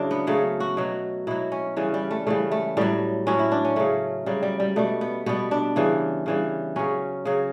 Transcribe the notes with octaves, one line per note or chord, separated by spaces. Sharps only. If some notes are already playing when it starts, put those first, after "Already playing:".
Already playing: C#3 F#3 D4 E4
B3
C#3 F#3 A3
F#4
B2 F#3
B2 F#3 E4
C#4
C#3 E3 G3 C#4
G3
A3
C#3 E3 G3 A3
A3
A2 F#3 G3
A2 F#3 C#4
E4
D4
C#4
C#3 F#3 A3
C#3 F#3 G3
G3
G3
B2 G3 A3
B3
B2 G3 B3
D4
C#3 E3 G3
C#3 E3 G3
C#3 F#3 C#4
C#3 F#3